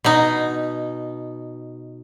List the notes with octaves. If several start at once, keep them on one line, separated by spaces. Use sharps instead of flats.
B2 D#4